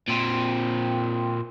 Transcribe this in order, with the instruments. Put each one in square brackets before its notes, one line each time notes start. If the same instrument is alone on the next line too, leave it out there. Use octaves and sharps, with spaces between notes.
[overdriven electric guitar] A#2 C4